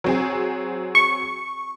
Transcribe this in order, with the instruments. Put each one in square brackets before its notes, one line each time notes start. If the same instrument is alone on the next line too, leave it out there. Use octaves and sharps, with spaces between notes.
[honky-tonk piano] F#3 C4 G#4
[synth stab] C#6